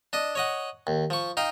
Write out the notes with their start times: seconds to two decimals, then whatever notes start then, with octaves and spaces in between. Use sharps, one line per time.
0.13 D4 D#5
0.35 C#5 D#5 F#5
0.87 D#2
1.10 F3 C#6
1.37 D#4 F5 G5